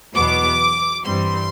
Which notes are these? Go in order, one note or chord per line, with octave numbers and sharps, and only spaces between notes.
E2 B2 F#3 B3 D6
G2 E3 G3 C4 C6